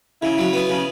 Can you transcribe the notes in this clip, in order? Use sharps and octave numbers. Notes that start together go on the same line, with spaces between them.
C#3 E4
F#3
B3
C#3